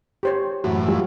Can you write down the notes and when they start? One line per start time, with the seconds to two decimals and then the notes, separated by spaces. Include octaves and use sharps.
0.23 G4 C5 C#5
0.64 F#2 A2 E3 F#4
0.89 G3 F4